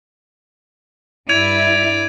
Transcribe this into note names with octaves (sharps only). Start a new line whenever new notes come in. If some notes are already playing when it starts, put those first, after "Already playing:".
G2 E4 D5 G#6 D#7 F7